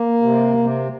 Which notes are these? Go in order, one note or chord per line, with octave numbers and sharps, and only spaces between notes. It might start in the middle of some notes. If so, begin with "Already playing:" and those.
Already playing: A#3
C3
C3